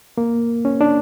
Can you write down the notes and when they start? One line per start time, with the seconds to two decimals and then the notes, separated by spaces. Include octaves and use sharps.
0.18 A#3
0.65 C#4
0.81 D4